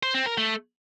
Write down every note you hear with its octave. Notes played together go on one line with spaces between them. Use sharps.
C5
C4
A#4
A3